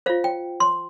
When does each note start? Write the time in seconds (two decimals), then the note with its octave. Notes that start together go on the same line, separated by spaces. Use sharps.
0.06 F4 C5 F5
0.24 G5
0.60 C6